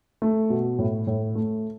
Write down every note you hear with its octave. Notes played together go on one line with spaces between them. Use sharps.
A3
B2
A2
A2
A3